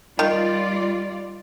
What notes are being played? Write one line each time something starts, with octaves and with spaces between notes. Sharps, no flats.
D#3 G3 F4 D5